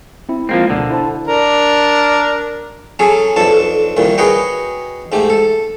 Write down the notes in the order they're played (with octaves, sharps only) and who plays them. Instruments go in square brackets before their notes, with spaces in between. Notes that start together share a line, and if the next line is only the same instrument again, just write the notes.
[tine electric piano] C4 E4
[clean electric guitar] F3 A#3 C4 [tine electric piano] G#3 F4
[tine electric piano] D2 B2 [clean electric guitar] D3
[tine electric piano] E4 C5 A5
[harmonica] D4 A#4
[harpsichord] F#3 C#4 G#4 A4
B1 F2 D4 A4 A5
C2 A#2 D#3
F#4 G#4 B4 C#5 D#5 G5
G#2 A3 G4
A4